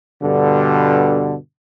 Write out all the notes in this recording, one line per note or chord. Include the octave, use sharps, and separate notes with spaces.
G2 B2 D3